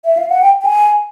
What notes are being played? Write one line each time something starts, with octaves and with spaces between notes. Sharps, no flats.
E5
F5
F#5
G5
G5
G#5